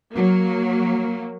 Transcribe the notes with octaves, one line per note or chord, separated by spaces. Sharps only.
F#3 A#3